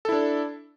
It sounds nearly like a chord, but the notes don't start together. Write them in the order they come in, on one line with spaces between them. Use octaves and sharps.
A4 E4 D4